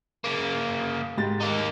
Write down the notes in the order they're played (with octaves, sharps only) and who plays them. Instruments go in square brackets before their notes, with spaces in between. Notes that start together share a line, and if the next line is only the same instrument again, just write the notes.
[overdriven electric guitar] C#3 A#3
[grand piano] G#2 G4 A6
[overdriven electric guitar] A#3 D#4